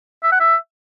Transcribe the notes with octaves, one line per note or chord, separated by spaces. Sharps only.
E5
F#5
E5